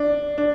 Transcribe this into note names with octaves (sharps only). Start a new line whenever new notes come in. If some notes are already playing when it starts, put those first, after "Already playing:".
Already playing: D4
D4